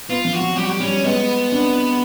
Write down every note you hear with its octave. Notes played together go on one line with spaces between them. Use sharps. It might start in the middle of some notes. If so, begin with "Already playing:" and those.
B3 F4
F3
F#4
F#3
G3 G4
F#4
G4
G3 C#4
G#3 B3
D4